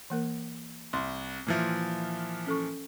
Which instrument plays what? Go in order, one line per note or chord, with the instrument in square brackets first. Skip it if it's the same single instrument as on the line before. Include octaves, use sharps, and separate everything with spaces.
[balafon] E3 A#3 A#4
[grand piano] C2 [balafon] C6
[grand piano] A#2 E3 F3
[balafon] C#4 A4 C#6